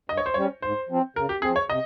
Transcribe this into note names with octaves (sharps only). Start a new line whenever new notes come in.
G2 D#5
C#5
C5
G3 C#4 C#5
G#2 C5
F3 C4
C#3 A#4
G4
F3 C4 G#4
C#5
C3 D#5